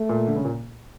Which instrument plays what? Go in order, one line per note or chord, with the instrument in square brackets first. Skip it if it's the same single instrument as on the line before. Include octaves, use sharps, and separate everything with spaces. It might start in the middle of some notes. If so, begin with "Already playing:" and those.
Already playing: [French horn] A3
[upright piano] A#2
D3
C#3
A#2